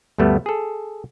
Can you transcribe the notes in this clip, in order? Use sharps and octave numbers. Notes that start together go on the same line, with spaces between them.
D2 G2 G3 A3 B3
G#4 A4